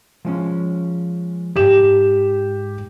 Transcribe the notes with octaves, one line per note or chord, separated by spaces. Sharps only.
F3 G#3 C#4
D#2 G#2 G4 E7